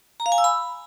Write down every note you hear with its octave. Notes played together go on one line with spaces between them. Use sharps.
A#5
F5
G#5
E6
B5